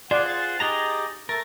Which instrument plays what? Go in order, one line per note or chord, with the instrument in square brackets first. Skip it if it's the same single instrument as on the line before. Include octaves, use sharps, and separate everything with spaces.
[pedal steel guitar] F4 G#4 C5 [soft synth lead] D5 [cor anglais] F#5
[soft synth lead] A6
[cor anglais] D#4 [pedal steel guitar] G4 G#4 A#5
[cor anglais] A3 [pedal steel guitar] A#4 [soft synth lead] A6